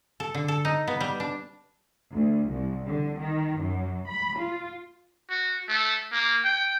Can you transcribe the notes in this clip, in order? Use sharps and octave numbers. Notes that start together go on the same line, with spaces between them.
A4
D3
A4
D#4
B3
G3
D4
D2
C2
D3
D#3
F#2
B5
F4
F#4
A3
A#3
G5